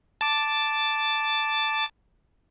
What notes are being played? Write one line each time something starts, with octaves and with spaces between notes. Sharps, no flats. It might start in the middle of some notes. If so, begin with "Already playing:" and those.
A5 D6